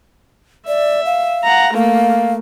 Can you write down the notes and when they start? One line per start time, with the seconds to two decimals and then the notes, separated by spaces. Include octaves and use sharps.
0.67 D5 E5
1.06 F5
1.44 F#5 A#5
1.74 A3 A#3 F5